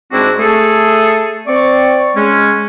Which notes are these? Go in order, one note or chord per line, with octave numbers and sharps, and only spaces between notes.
G#2 G#3 C4 D4 E4 F#4
A3 G#4 A4
C4 D5 C#6
G#3 C#4